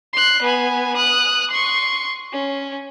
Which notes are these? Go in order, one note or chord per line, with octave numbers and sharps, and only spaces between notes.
C6 F#6
B3 G#5
D#6 F#6
C6 C#6
C#4